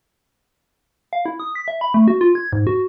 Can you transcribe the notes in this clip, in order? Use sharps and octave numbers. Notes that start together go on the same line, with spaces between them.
F5
E4
D#6
B6
E5
B5
A3
F#4
F4
G#6
G#2
F#4